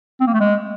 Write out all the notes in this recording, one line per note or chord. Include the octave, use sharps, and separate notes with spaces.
C4
A#3
A3
G#3